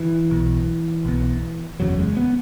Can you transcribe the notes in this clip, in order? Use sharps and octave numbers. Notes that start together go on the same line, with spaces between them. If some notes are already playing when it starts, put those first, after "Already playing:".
Already playing: E3
B1 B2
B1 B2
F#1 E2 C#3 F#3
G#3
B3